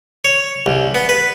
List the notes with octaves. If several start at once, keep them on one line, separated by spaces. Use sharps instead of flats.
C#5
C2
B3
B4